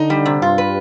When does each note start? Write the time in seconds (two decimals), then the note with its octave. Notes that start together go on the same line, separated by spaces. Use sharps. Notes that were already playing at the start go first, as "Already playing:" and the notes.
Already playing: D3 D#4
0.10 G3
0.25 C3
0.42 G2 F4
0.58 B4